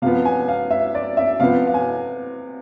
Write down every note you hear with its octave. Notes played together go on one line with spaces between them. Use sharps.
C3 F3 B3 F5
G#5
F5
E5
D5
E5
C3 F3 B3 F5
F5
G#5